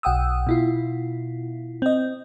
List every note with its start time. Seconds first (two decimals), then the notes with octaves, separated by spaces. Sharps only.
0.03 B1 F#5 G5 D#6 E6
0.47 B2 E4 F4
1.82 C4 D#5